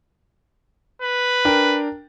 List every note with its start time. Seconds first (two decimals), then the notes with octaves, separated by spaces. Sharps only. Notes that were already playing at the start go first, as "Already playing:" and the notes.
1.02 B4
1.45 D4 A#4 G5